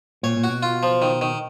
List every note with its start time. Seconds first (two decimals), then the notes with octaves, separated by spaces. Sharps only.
0.23 A#2 C#5
0.37 A#2
0.44 F#4
0.49 B2
0.63 F4
0.83 F3
1.02 D#3
1.21 D#3